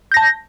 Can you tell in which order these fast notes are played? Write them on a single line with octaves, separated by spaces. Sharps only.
G6 A#6 A5